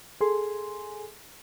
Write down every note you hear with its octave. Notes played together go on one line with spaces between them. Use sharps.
G#4 A4 G#5 C6